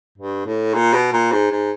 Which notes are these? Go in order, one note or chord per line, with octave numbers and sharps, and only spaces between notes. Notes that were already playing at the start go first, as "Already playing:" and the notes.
G2
A2
A#2
B2
A#2
G#2
G#2